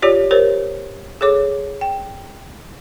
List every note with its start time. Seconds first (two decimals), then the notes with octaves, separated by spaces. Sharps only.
0.02 F4 G4 C#5 D5
0.31 G4 A#4 C5 C#5
1.21 G#4 A4 C#5 D6
1.81 G5